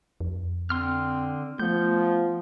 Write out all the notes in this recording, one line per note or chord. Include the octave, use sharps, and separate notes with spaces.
F2
D3 C4 C6 F6
F3 A3 B3 G6